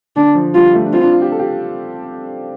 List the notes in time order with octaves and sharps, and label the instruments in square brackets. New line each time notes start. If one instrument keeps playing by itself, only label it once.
[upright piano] D3 [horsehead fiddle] D4
[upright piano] F3
[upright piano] G3 [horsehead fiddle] F4
[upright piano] A3
D4
[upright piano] C4 [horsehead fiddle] F4
[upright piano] D4
F4
G4
A4
G4